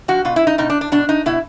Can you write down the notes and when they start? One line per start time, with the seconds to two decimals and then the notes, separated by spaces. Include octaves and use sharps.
0.08 F3 F#4
0.25 B2 F4
0.36 E4
0.47 D#4
0.58 B2 D#4
0.70 D4
0.81 D4
0.92 B2 D4
1.09 D#4
1.26 B2 E4